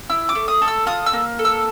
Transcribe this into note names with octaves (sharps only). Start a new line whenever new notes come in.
E4 E6
D6
A3
D#6
A4
E6
F4 D#6
E6
A#3
A4
E6